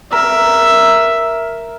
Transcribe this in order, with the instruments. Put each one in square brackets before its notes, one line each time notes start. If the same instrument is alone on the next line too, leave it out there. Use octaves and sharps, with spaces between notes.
[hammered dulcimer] A#4 [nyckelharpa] E5